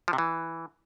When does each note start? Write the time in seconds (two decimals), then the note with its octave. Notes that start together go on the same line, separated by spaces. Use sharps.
0.08 F3
0.13 C3
0.18 E3